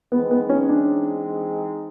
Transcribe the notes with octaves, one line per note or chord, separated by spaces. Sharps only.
E3 G#3 B3 C4 D#4
B3
C#4
D4